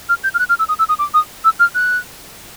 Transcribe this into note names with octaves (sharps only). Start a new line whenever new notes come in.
F6
G6
F6
F#6
F6
E6
D#6
E6
D#6
D6
D#6
E6
F6
F#6